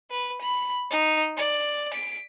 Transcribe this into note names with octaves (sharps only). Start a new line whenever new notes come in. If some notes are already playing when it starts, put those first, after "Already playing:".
B4
B5
D#4
D5
B6 D7